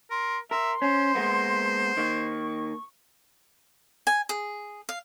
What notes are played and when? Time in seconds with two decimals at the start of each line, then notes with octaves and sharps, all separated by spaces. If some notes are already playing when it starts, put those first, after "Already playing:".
0.11 A#4 C6
0.51 A#4 E5 C6
0.82 C#4 C5
1.15 G#3 A#3 B3
1.97 D#3 A#3 C#6
4.07 G#5
4.29 G#4
4.89 F5